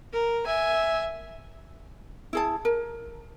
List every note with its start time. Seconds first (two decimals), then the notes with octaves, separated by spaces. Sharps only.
0.13 A#4
0.47 E5 G#5
2.33 E4 G#4 A5
2.65 A#4